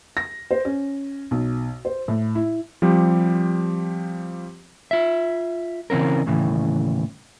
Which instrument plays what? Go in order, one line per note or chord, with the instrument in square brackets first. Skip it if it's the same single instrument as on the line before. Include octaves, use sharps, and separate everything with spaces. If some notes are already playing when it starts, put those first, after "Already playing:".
[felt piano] A#6
C5
C#4
B1
C5
A2
E4
[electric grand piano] F3 G3 C4 G4
[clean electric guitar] F4 E5
C#3 E3 C4 C#4 A#4
D#2 A2 C#3 E3